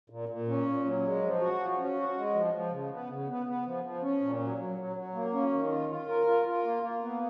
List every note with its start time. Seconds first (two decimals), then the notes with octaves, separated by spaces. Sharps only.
0.10 A#2
0.29 A#2
0.48 C#4
0.66 A#2
0.84 F#3
1.03 G#3
1.23 F3
1.40 F#4
1.60 F3
1.78 C#4
1.97 F#4
2.16 G#3
2.35 F3
2.53 F3
2.72 C#3
2.90 B3
3.10 C#3
3.28 B3
3.47 B3
3.65 F3
3.84 F3
4.03 C#4
4.21 A#2
4.40 F#3
4.58 F#3
4.78 F#3
4.96 F#3
5.15 A#3
5.33 C#4
5.53 D#3
5.71 F4
5.89 F4
6.08 A#4
6.27 F4
6.46 F4
6.64 A#3
6.83 A#3
7.01 B3